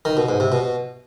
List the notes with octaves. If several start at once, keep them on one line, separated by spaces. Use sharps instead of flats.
D#3
B2
G#2
C3
B2